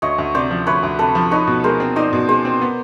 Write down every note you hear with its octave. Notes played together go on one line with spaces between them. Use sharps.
D2 C#5 D#5
D2
C3 C5 D5
F3
D2 B4 C#5
D2
C3 A4 B4
F3
D#4 B4 C#5
B2
G#3 A#4 C5
C4
D#4 C5 D5
B2
G#3 C5 D5
C4
B3